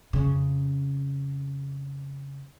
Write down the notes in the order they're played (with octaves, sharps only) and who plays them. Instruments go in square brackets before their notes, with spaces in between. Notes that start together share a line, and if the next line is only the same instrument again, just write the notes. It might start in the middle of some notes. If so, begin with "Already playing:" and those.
[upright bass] F2 C#3